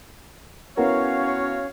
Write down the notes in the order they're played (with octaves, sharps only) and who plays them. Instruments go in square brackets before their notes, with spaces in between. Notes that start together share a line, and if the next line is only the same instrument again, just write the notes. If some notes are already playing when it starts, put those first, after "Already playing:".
[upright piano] B3 E4 A#4 [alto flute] C#4 [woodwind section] F#4 C#5 F5